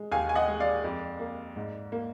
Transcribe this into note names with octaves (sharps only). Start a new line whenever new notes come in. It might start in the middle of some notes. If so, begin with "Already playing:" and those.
Already playing: G#3
D#2 F5 G#5
G#5
D#5 F#5
G#3
D5 F5
F2
A#3
G#2
A#3